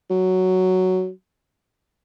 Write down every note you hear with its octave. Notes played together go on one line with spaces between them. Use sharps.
F#3